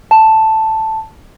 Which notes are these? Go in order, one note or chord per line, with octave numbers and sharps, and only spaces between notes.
A5